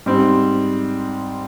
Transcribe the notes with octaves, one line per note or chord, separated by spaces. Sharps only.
G#2 G3 C4